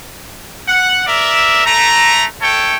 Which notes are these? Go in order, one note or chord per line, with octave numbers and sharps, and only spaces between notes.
F#5
A#4 D5 E5
A3 A#5
A3 A4 C#5 G5